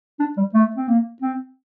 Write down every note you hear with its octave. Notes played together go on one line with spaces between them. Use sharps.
D4
G3
A3
C4
A#3
C4